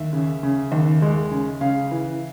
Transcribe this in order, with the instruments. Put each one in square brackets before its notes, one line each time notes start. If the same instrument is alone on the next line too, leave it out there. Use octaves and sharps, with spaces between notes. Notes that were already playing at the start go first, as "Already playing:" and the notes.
Already playing: [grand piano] D#2 E5
C#3
C#3
D#2
G#3
C#3
C#3 F5
E3